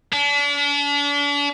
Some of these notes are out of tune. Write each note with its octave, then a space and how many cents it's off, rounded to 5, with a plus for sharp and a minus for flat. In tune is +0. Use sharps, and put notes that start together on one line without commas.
D4 -40